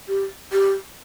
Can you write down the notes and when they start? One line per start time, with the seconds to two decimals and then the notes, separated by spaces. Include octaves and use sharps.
0.09 G4
0.53 G4